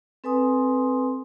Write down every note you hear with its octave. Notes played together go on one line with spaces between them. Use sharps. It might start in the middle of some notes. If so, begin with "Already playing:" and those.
C4 A4 B4 G#5 C6 D#6